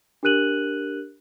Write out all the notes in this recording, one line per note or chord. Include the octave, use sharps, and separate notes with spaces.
D4 G4 A#4 F#6 D#7 F#7